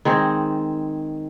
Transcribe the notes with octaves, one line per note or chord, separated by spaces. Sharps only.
D#3 G#3 C4 G#4